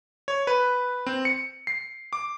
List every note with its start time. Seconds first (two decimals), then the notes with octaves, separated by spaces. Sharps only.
0.28 C#5
0.47 B4
1.06 C4
1.25 C#7
1.67 C7
2.13 D6